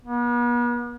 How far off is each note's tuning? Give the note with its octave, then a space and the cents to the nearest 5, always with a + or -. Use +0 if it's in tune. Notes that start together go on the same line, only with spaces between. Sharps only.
B3 -45